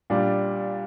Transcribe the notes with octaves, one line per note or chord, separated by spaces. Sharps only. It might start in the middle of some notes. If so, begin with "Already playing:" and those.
A#2 G3 D4